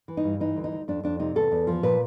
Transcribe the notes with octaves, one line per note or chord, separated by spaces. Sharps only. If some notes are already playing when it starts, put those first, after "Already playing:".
E3
D#4
G2
E3 D#4
D2
D#4
D2
F2 D4
F2 D4
C3 D#4
E2 A4
E2
F3
A#2 B4